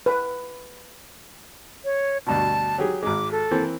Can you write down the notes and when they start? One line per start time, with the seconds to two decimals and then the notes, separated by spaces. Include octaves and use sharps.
0.06 B4
1.85 C#5
2.27 D2 G2 B2 A5
2.78 F#3 G4 G#4
3.03 G#1 G#3 D6
3.32 A4
3.51 E3 A#3 C4